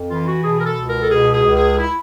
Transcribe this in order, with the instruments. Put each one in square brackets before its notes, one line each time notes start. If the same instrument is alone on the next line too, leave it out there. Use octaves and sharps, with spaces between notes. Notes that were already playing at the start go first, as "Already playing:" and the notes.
Already playing: [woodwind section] F2
E3 F4
F#4
B2 G#4
A#4
A4
C#2
A#4
A4
B2 G#4
G#4
C#2
G#4
E4